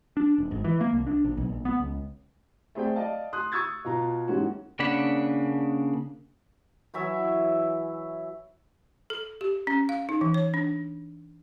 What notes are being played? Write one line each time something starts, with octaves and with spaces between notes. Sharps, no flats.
D4
D#1
G#1
E3
A#3
C2
D4
A#1
B1
A#1
B3
C#2
A3 C4 G#4 C5 D5 G5
D5 D#5 F5 A5
C6 D#6 F#6
C#6 D#6 E6 G#6 A6
B2 F4 A#5
G#2 E3 G3 A#3 C#4 F#4
C#3 A#3 D4 F#5 B5
E3 F#3 E5 G#5
A4
G4
C#4
F5
D#4
E3
C#5
D4